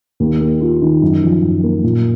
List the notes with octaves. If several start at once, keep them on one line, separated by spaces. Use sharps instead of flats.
D#2
A#3
F4
D#3
F#2
F3
F#2
A#3
A#2